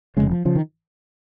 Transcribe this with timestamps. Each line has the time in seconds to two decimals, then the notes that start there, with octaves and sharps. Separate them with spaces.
0.17 F1 D#2 C#3 G#3
0.31 F3
0.45 C#3 F3
0.55 D#3